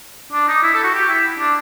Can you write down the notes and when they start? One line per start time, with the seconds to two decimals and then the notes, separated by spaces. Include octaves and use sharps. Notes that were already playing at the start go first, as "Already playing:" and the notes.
0.32 D4
0.48 D#4
0.63 E4
0.74 A4
0.83 F#4
0.94 G4
1.09 E4
1.39 D4